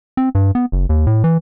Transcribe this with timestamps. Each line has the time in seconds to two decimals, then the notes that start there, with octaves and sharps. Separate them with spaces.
0.17 C4
0.35 G2
0.55 B3
0.72 F#1
0.89 D#2
1.07 A2
1.24 E3